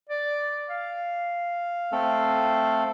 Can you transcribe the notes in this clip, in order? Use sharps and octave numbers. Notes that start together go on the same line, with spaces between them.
D5
F5
A3 C4 A4